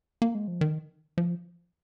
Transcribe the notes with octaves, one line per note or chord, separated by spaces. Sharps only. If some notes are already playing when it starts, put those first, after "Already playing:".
A#3
G#3
F3
D#3
F3